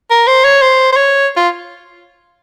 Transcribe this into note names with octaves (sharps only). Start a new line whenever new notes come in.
A#4
C5
C#5
C5
C5
C#5
F4